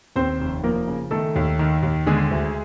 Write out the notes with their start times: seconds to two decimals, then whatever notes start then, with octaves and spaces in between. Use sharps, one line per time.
0.16 D#2 C4 C5
0.40 F1
0.64 F3 A#3 A#4
0.87 C#3
1.11 D#3 A3 A4
1.36 D#2
1.59 D#3
1.83 D#2
2.06 D3 G#3 G#4
2.31 D2